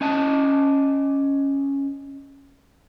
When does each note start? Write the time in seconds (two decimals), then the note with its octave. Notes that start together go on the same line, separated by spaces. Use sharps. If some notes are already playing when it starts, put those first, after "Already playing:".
0.01 C#4 D#5 A5